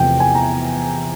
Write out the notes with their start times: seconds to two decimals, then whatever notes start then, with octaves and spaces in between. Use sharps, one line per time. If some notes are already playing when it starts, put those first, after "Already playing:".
Already playing: E2 C3 F3 A3 G5
0.20 G#5
0.35 A#5